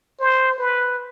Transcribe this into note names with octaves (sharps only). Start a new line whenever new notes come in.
C5
B4